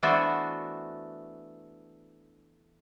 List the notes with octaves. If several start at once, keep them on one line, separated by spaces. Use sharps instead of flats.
E3 A3 B3 D4 F#4 C5